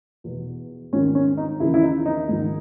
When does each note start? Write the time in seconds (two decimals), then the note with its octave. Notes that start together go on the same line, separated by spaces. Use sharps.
0.24 E2 B2
0.92 G#2 D#3 C#4
1.15 C#4
1.37 D#4
1.60 D#2 C#3 E3 E4
1.74 E4
1.82 D#4
2.06 D#4
2.29 G#2 D#3